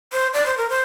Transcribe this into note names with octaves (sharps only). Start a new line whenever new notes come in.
C5
D5
C5
A#4
C5